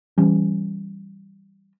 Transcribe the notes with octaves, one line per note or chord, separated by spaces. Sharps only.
E3 G3 C#4